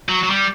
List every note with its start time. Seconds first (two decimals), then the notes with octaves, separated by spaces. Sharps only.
0.09 F#3
0.23 F#3
0.30 G3